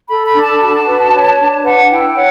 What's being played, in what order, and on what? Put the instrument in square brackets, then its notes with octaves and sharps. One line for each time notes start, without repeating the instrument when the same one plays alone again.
[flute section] A4 B5
B5
D4
A5
F#4 A5
B4
C#5
D4
B4 F#5
E4 G5
C#5 F#5